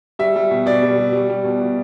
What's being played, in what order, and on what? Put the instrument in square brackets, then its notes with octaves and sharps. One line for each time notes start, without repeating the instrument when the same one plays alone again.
[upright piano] G3 E5
G3
B2
B2 D5
G3
G3
G3
G3
B2
B2